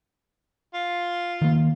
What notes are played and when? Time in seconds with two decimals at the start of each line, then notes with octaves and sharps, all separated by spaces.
0.74 F4
1.42 D#3 A#3